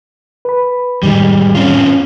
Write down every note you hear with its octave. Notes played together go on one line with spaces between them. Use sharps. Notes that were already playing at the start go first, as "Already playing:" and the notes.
B4 B5
F2 A2 D#3 G3 G#3
C4 C#4 F4